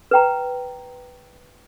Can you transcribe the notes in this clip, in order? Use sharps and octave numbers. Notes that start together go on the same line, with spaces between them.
B4 G5 A#5